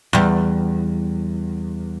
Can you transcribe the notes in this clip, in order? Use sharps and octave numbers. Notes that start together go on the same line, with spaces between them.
E2 G3